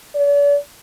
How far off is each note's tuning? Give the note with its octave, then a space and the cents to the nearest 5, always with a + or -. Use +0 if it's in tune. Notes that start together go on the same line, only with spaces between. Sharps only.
D5 -45